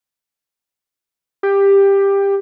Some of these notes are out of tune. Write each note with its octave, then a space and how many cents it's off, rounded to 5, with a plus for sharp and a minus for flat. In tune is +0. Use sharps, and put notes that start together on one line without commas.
G4 +15